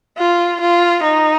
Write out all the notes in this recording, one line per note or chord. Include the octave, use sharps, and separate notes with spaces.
F4
F4
D#4